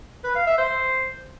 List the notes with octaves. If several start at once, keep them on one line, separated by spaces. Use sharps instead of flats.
B4
F5
E5
C5